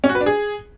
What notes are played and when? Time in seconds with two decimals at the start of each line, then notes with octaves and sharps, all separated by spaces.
0.04 C#4
0.09 F#4
0.15 B4
0.21 D4
0.26 G#4